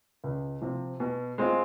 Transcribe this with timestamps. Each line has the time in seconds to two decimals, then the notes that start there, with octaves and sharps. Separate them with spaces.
0.24 C#2
0.61 C3 F3
1.00 B2
1.38 G#3 C4 F4